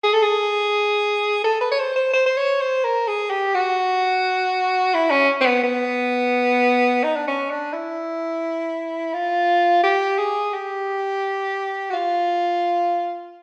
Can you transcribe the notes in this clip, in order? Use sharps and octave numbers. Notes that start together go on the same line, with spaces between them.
G#4
A4
G#4
A4
B4
C#5
C5
C5
C5
C5
C#5
C5
A#4
G#4
G4
F#4
E4
C#4
C4
B3
B3
D#4
D4
C#4
D4
E4
F4
G4
G#4
G4
F#4
F4